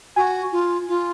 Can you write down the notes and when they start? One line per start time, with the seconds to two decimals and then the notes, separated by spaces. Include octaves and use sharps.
0.16 F#4 G#5
0.52 F4
0.88 F4